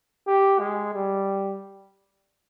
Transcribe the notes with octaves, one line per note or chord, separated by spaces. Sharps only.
G4
G#3
G3